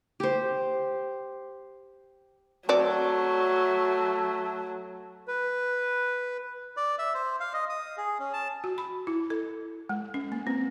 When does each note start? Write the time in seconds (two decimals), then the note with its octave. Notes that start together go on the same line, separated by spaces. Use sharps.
0.20 G4 C5
2.69 F#3 A3 C4 F#4 D5
5.28 B4
6.77 D5
6.98 E5
7.14 C5
7.40 F5
7.53 D#5
7.69 D#6
7.97 G#4
8.19 C#4
8.33 A5
8.64 F#4
8.78 B5
9.07 E4
9.30 A4
9.89 G#3
10.14 C#4
10.32 A#3
10.47 C4